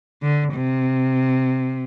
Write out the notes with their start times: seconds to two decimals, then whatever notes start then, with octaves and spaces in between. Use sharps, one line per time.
0.23 D3
0.54 C3